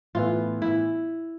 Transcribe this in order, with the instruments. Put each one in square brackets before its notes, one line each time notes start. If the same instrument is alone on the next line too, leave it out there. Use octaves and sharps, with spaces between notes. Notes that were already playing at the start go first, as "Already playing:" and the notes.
[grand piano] A2 E3 B3 [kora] F4
[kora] E4